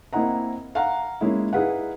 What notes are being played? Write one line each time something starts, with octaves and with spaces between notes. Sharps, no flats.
A#3 C4 E4 D#5 F#5 A#5
F5 F#5 A#5
G#3 A#3 C#4 D#4 E4
D#4 E4 G#4 B4 F5 F#5